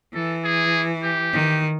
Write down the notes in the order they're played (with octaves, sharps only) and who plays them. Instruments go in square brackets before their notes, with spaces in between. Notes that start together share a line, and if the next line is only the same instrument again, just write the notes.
[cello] E3 [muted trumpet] A4
[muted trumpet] G#4
G4
[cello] D#3